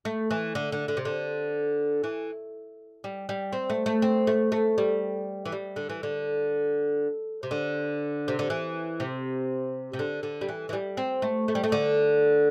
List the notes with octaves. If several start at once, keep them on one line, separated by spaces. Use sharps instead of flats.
A3
E3
D3
D3
D3
C3
D3
E3
G3
G3
C4
A3
A3
C4
A3
A3
G3
E3
G3
D3
E3
D3
C3
D3
C3
D3
E3
C3
C3
D3
D3
G3
E3
E3
G3
C4
A3
A3
G3
A3
D3